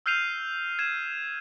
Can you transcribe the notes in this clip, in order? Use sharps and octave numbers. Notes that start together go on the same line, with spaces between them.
E6 F6 G6 C7 D#7 F7
G#6 D#7 E7